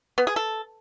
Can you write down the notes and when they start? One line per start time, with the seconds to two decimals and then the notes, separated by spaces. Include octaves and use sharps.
0.18 B3
0.27 G#4
0.36 A4